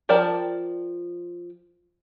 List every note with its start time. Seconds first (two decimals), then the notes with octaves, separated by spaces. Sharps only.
0.09 F3 A#4 D5 G5 A5